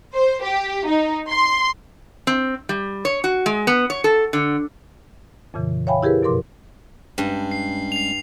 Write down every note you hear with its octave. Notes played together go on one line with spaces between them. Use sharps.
C5
G4
D#4
C6
C4
G3
C#5
F#4
G#3
B3
C#5
A4
D3
F2 A#2 C#3 E3
C#5 E5 F5 G5 G#5 B5
E4 G4 G#4 A#4 B4
F#2 B2 F3 A#4 C6 D6
G2 G3 G#3 C#4
C7
C7 F7